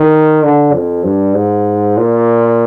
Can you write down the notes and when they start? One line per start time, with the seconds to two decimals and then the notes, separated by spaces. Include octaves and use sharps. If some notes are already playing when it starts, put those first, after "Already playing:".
Already playing: D#3
0.43 D3
0.73 F2
1.04 G2
1.35 G#2
1.97 A#2